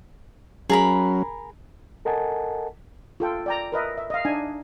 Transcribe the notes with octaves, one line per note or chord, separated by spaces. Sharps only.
F#3 C#4 G#4 A#4 B5
A4 A#4 D#5 F#5 G#5 A5
F4 A4 G5
D5 G5 A#5
A#4 B4 D#5 E5
E5
D#5 F5
D4 D#4 G#5